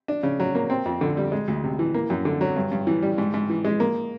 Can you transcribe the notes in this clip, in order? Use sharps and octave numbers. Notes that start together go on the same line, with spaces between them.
D4
C#3
F#3
A#3
C4
F2
D3
G3
G#3
D2
C3
E3
A#3
F#2
D3
F#3
G2
G2
E3
G3
G#2
G#2
E3
G#3
A#3